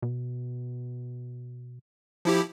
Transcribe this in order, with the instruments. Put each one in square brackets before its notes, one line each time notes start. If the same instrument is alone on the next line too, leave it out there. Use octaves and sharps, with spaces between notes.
[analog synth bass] B2
[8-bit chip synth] F3 E4 G4